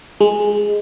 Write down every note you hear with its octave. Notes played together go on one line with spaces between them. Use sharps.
G#3